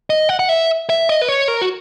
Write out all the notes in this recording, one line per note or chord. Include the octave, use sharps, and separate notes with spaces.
D#5
F#5
F#5
E5
E5
D#5
B4
C#5
A#4
F#4